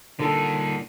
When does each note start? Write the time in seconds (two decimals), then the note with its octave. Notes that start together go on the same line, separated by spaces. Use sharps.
0.19 A#2 D3 D#4 A4